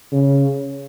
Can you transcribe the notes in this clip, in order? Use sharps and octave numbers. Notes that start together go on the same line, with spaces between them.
C#3